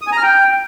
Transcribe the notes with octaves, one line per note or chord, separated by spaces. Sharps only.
D#6
G#5
A#5
F6
G5